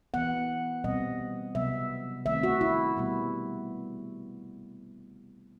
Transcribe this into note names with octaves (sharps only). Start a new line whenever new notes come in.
E3 B3 F#5
B2 G3 C4 D#5
C3 F#3 B3 E5
D#3 A3 C4 E5
F#4
E4
B2 G3 B3